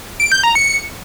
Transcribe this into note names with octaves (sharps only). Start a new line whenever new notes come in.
D7
G6
A#5
C#7